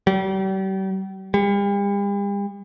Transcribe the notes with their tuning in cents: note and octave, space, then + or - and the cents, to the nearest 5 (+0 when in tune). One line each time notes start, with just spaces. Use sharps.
G3 -40
G3 +45